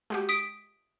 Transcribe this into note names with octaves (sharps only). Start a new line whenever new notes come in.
G#3 F#4 G4
D#6 B6 D7